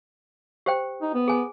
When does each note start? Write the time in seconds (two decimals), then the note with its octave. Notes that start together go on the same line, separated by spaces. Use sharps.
0.66 G4 C5 G5
1.02 D#4
1.14 B3
1.28 G#4 G#5